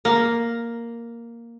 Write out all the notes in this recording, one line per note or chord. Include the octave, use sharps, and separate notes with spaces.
A#3